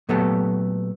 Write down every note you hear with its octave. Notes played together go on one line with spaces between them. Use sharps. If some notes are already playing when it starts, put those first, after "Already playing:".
A#2 F#3 A3 B3 G4 A4